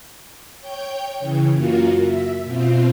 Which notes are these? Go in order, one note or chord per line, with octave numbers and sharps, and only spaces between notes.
C#5 G5 G6
C#3 E3
F#2 A#3 F4 F#4
E5
B2 C4 F4